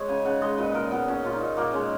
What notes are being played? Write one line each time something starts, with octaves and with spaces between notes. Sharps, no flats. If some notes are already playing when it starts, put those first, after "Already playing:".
Already playing: G#3 D#4 C#5
C#3 G#5
C#3 F#5
G#3 D#5
A#2 B4
A#2 A#4
A#2 B3
A#2 C#4
A#2 F4
D#4
A#2
A#2 A#3
G#3 C#4